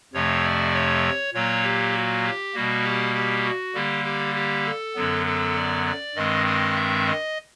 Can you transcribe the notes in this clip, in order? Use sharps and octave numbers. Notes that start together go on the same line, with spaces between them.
F2 C3 F3 A3 C#5
D5
C#5
A#2 F#3 A#3 C#5
G4
F#4
G4
B2 G3 A#3 F#4
G4
G4
F#4
D3 G3 A#3 G4
G4
G4
A4
F#2 D3 F#3 B3
A4
D5
D5
G2 D#3 G#3 C4 D#5
D#5
E5
D#5